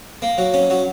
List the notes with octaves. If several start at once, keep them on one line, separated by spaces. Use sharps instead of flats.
A#3
F#3
C#4
F#3